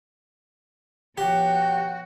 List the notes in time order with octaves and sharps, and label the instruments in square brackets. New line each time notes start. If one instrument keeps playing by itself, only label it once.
[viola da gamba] B2 F3 C#5 [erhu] F#4 [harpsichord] G4 [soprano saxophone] G5